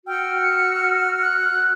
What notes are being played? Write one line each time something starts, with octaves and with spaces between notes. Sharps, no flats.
F#4 G5 E6 F6
C#7
F#6